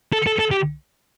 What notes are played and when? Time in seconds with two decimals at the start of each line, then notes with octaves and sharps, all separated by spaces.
0.13 A4
0.27 A4
0.39 A4
0.51 G4